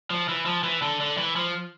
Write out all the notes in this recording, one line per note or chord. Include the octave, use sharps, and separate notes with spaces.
F3
E3
F3
E3
D3
D3
E3
F3